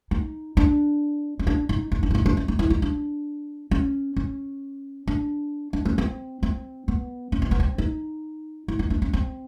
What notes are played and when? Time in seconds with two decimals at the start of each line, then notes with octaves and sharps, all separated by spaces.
0.11 D#4
0.57 D4
1.39 C#4
1.47 D4
1.69 D#4
1.92 D#4
2.03 D4
2.11 E4
2.15 D#4
2.26 D4
2.37 C#4
2.48 D#4
2.59 E4
2.70 D#4
2.82 D4
3.71 C#4
4.16 C#4
5.08 D4
5.73 D4
5.85 C#4
5.98 C4
6.43 C4
6.88 B3
7.32 C#4
7.42 C4
7.51 B3
7.60 C4
7.78 D#4
8.68 E4
8.79 D#4
8.90 D4
9.02 C#4
9.13 C4